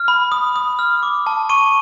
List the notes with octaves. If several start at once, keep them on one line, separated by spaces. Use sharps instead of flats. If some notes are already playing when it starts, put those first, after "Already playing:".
Already playing: F6
B5
D#6
D#6
F6
D6
A5
C#6 D#7